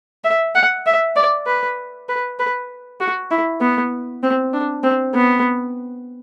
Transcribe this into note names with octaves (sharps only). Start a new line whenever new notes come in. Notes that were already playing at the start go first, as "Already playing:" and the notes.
E5
F#5
E5
D5
B4
B4
B4
F#4
E4
B3
C4
D4
C4
B3